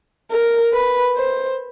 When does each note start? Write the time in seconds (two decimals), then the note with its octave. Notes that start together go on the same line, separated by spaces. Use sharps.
0.31 A#4
0.73 B4
1.17 C5